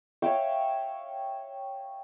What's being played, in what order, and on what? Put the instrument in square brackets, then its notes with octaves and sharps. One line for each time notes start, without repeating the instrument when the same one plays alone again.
[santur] C#5 E5 F5 G5